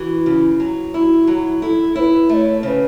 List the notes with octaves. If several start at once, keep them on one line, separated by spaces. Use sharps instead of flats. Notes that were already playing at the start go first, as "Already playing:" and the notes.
Already playing: E3 F#4
C#3
F#3
E4 F#4
F#4
F#3
E4
E4 A4
E4 B4 C#5
A3 C#5 E5
C#3 B4 C#5